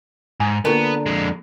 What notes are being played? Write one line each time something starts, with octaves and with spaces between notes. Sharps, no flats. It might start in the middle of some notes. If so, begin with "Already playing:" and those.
G#2 G#5
D3 A#3 B3 F4 A#4 A#5
F2 G#3